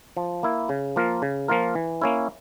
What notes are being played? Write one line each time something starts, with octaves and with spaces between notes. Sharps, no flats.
F3
A#3 E4
C#3
F3 A#3 F4 A#4
C#3
F3 A#3 F4 A#4
E3
A#3 C#4 E4